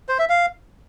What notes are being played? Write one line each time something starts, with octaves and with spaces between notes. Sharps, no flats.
C5
E5
F5